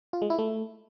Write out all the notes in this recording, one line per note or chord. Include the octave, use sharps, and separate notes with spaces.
F4
G#3
E4
A3